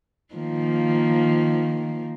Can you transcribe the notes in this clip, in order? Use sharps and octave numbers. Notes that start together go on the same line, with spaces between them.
D#3 F3 A#3